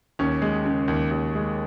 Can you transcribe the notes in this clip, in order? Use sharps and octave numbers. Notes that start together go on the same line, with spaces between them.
D#2 C#4
G#3
C#3
D#2
D#2
G#3